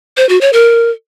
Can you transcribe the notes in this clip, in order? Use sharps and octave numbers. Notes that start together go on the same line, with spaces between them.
C5
F#4
C#5
A#4